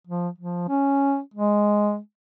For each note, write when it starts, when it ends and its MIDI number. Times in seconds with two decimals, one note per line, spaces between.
0.07 0.29 53
0.38 0.65 53
0.68 1.19 61
1.34 1.98 56